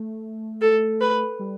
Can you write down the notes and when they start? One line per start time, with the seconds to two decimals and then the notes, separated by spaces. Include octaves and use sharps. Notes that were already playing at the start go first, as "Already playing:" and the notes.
Already playing: A3
0.61 A4
1.01 B4
1.39 G3